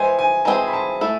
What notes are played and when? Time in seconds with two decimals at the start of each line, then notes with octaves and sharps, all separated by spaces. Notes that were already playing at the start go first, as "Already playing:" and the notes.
Already playing: E3 G#3 C5 G#5
0.19 G#5
0.45 E3 G#3 C4 G#4 C5 A5
0.68 B5
0.73 A5
1.01 A3 E4 A4